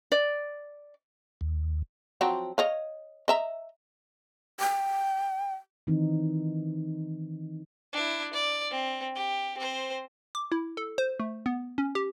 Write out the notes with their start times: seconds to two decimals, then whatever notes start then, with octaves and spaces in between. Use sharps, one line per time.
0.12 D5
1.41 D#2
2.21 F3 F#3 C4
2.58 C#5 D#5 F5
3.28 D#5 E5 A#5
4.60 G5
5.87 D#3 E3 C4 D#4
7.93 D4 E4
8.33 D5
8.71 C4
9.16 G4
9.58 C4 C5
10.35 D6
10.52 E4
10.77 A4
10.98 C5
11.20 A3
11.46 B3
11.78 C#4
11.95 G4